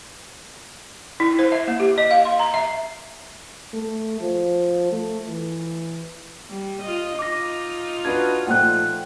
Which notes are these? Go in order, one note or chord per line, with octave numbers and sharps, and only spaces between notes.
E4
C5
E5
A#3
G4
D#5
F5
C6
A#5
E5
A3
F3
A3
E3
G3
F4 D#5
D#4 F4 D6 A#6
D4 F#4 B4 G#6
A#2 F3 A3 F#5 G5 F#6